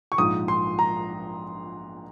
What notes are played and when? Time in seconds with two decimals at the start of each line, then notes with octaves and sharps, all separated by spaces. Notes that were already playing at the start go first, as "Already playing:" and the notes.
0.12 C#6
0.18 A#1 G#2 F3 D#6
0.48 C6
0.79 A#5